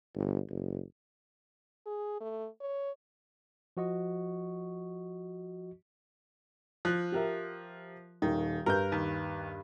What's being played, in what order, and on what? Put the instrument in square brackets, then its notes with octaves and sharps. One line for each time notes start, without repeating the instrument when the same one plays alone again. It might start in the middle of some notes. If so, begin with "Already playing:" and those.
[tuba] G1
F#1
[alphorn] G#4
A3
C#5
[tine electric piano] F3 F#4 D#5 C#6
[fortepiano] F3 [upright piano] F#6
[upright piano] G4 A#4 E5
[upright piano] D#1 [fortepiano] D#3
[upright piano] G2 B4 G6 [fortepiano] A#4
[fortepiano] D#2